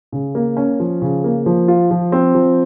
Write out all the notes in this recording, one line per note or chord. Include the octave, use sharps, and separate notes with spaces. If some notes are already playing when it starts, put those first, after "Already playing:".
C#3
A#3
C#4
F3
C#3
A#3
F3
F4
F3
C4
F3